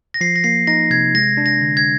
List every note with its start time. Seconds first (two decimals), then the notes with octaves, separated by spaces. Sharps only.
0.14 A#6
0.21 F3 C7
0.36 A#6
0.44 A#3 C7
0.67 D#4 A#6
0.91 C3 G#6
1.15 G#3 A#6
1.37 D4
1.46 A#6
1.61 D3
1.77 G#6